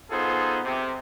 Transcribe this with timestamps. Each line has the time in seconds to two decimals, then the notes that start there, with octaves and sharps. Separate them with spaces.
0.11 B3 D#4 F4 G#4 A4 C5
0.65 C3